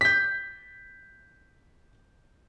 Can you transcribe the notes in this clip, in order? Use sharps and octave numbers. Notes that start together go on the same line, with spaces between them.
G6 B6